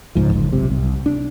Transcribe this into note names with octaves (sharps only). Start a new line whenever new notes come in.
C#2 G#2 F3
F#1
B1 C3
C2
D4